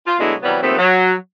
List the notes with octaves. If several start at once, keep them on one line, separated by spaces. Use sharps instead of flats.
F4
B2 F#3 G#3 A3 D4 E4
C3 E3 F#3 G3 B3
D#2 F3 A3 B3 C4
F#3